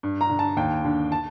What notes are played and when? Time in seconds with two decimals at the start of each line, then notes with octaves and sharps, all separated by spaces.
0.03 G2
0.21 A#5
0.30 D3
0.39 A5
0.57 D#2 G5
0.84 D3
1.12 A5